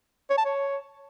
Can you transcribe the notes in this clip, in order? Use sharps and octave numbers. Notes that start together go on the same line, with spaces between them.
C#5
A5
C#5